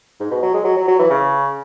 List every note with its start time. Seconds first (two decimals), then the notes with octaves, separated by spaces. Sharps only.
0.20 G#2
0.31 B2
0.43 F#3
0.54 G#3
0.65 F#3
0.77 F#3
0.88 F#3
0.99 E3
1.10 C#3